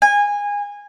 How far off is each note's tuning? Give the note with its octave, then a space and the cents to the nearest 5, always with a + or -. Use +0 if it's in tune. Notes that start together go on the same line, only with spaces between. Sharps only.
G#5 -20